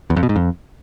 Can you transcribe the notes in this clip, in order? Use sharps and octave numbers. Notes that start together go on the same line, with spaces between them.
E2
F2
B2
G#2
F2